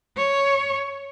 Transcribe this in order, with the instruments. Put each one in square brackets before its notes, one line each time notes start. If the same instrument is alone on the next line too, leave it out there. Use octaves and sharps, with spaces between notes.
[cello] C#5